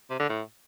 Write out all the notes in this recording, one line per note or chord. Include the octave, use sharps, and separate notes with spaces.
C3
D3
A2